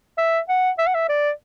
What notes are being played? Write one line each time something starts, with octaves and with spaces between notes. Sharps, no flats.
E5
F#5
E5
F#5
E5
D5